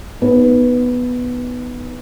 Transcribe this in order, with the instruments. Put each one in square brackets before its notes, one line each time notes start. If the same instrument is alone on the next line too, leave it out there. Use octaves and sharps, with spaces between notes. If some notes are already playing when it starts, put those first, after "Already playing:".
[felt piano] B3 D#4 B4